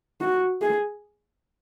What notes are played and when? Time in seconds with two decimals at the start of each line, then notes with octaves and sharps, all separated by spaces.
0.21 F#4
0.62 G#4